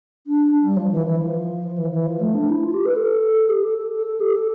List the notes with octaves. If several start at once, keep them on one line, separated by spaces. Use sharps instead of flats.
D4
G3
F3
E3
E3
F3
E3
E3
F3
A3
D4
E4
F4
G4
B4
A4
G4
A4
A4
A4
A4
G4
A4